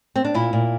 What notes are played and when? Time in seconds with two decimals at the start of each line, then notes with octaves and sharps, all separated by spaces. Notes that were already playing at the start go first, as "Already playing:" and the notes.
0.16 C4
0.25 D4
0.34 A#2 E4
0.53 A#2